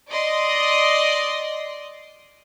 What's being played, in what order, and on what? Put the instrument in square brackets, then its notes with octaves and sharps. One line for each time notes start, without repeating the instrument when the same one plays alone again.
[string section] D5 D#5 C6